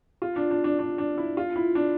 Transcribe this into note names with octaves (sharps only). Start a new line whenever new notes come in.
F4
D4
D4
D4
D4
D4
E4
F4
E4
D4